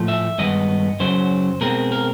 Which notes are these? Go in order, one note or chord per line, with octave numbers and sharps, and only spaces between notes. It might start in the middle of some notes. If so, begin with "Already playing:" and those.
Already playing: A2 F3 A3
E5
G2 D#3 G#3 B3 D#5
F#2 C#3 F#3 C5
B2 G#3 C4 A#4
A#4